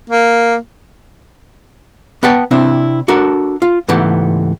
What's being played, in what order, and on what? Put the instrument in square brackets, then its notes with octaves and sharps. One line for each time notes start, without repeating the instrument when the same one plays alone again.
[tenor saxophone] A#3
[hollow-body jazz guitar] B3 B4 F#5 G5 A5
C3 C4 D4 E4
D4 F#4 A4 A#4
F4
C#2 G#2 E3 A3 B3 G4